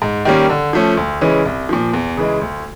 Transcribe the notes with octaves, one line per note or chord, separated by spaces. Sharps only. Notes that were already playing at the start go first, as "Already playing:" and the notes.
G#2
D#3 G3 A#3 C#4
D3
F3 A3 C#4
D2
C#3 E3 G#3 C#4
C2
A#2 F3
E2
C#3 E3 G#3
D2